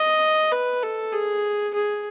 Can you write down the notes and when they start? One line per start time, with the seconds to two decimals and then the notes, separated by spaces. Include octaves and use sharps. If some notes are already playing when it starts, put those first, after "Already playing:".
Already playing: D#5
0.52 B4
0.82 A4
1.12 G#4
1.73 G#4